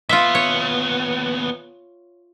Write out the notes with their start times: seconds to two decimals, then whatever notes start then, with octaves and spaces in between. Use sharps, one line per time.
0.09 D#2 B3 F4 E5
0.35 C#5